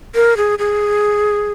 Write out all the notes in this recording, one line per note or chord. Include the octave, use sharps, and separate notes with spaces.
A#4
G#4
G#4